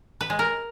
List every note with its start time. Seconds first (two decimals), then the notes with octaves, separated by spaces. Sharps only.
0.21 B4
0.30 G#3
0.39 A#4